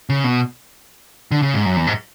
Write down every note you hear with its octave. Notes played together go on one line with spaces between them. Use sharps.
C#3
B2
D3
C#3
G#2
F#2
E2
G#2